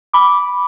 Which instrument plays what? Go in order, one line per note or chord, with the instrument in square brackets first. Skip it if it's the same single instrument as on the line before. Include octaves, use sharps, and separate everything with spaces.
[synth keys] B5 D6